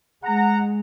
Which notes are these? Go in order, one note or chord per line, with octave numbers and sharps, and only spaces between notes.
G#3 F#5 A#5